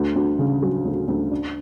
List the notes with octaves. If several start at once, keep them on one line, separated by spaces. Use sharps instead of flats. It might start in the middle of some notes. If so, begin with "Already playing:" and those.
Already playing: D2
D2
C#3
F#3
D2
D2
D4